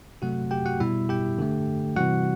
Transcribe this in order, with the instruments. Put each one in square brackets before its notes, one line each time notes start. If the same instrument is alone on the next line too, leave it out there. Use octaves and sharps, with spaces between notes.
[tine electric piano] C3 F#3 A3 F#4 F#5
G4 G5
F#4 F#5
B2 G3 E4 E5
G4 G5
D3 A3
C3 E3 G3 F#4 F#5